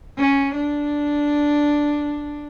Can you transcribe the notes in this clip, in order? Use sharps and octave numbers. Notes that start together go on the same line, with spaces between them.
C#4
D4